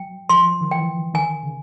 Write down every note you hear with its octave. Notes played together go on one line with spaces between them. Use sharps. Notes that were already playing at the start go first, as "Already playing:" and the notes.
Already playing: F#3 G5
F3 C6
D#3
E3 G5
D#3 G#5
C#3